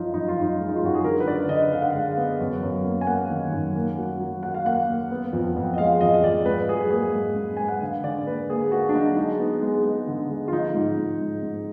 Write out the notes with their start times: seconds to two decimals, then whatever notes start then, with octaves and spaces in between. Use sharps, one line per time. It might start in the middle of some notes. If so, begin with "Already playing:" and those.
Already playing: F#2 F3 D#4 F4
0.14 F#2 D#4
0.28 F4
0.37 F#2
0.42 D#4
0.60 G#3
0.68 D#4
0.76 F4
0.82 F#2 F#4
0.95 G#4
1.04 D3 A#4
1.20 B4
1.26 D3 D5
1.49 D3 D#5
1.72 D3 F5
1.82 F#5
1.90 G#3 F5
2.17 B3
2.40 F#2
2.63 F#2
2.86 A#3
3.01 G#5
3.07 A#3 F#5
3.30 D#3
3.52 F#2
3.75 A#3
3.98 F#3
4.20 F#3
4.43 F#3 F#5
4.54 F5
4.65 A#3 F#5
4.88 A#3
5.11 B3
5.33 F2
5.56 F2
5.74 D#5
5.78 G#3 F5
6.01 F2 D#5
6.14 D#5
6.24 F2 D5
6.46 G#2 B4
6.68 F#3 G#4
6.91 A#3 G#4
7.13 G#2
7.36 G#2
7.57 G#2 G#5
7.68 F#5
7.81 D3 F5
8.04 D3 D5
8.27 A#3 B4
8.49 A#3 G#4
8.71 A#3 F#4
8.89 D4
8.95 F#3 D#4
9.16 G#3 D#4
9.40 B3
9.62 G#3
9.84 G#3
10.07 D3
10.30 G#3
10.48 F4
10.52 F3 D#4
10.75 G#2
10.97 G#2
11.21 G#2
11.42 G#2